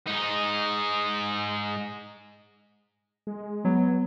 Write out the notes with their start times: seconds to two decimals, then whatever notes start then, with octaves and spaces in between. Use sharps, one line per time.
0.07 G#2 D#4
3.27 G#3
3.65 F#3 B3